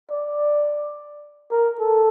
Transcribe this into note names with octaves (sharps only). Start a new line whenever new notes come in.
D5
A#4
A4